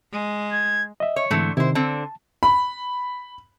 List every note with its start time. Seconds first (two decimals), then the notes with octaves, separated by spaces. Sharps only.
0.12 G#3
0.53 G#6
1.00 D#5 E5
1.16 C#5
1.31 G#2 D3 E3 A3 C4
1.57 C3 D#3 E4 C5
1.75 D3 C4 A5
2.43 B5